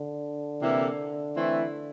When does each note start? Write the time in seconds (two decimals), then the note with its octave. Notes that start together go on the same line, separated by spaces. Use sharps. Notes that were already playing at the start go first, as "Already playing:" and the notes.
Already playing: D3
0.61 C3 E3 A#3 E4 A4
1.36 E3 A3 C4 E4